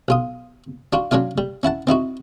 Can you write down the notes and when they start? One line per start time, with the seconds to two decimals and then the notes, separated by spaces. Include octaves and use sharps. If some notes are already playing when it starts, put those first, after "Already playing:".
0.08 B1 F4 D#6
0.93 D4 F4 F#4
1.11 F#3 C#4 D4 F4 F5
1.38 G3
1.63 C#4 E4 F#5 A5
1.87 C4 D#4 E4 F#4